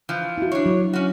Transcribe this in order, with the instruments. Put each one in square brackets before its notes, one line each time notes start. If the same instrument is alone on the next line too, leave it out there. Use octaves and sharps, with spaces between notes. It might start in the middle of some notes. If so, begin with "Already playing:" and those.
[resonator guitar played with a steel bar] E3 F3
[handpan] E4 F#4
[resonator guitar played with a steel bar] D4 C#5
[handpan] F#3
[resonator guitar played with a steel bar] C#4 F#4